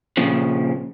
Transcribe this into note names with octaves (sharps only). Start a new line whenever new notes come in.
A#2 C#3 F3